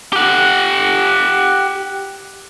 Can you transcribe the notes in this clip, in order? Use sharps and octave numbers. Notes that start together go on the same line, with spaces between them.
G4 F#5